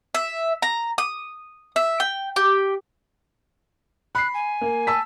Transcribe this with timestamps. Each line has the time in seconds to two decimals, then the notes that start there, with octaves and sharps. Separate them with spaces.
0.15 E5
0.62 A#5
0.98 D#6
1.76 E5
2.00 G5
2.36 G4
4.15 B5 F#6 C7
4.34 G#5
4.61 A#3
4.87 A5 E6 B6